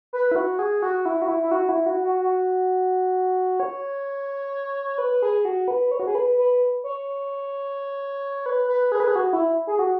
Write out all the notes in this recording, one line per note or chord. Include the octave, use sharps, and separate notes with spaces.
B4
E4
F#4
G#4
F#4
E4
F#4
E4
E4
F#4
E4
F#4
F#4
F#4
C#5
B4
G#4
F#4
B4
C#5
F#4
G#4
B4
B4
C#5
B4
B4
G#4
B4
G#4
F#4
E4
G#4
F#4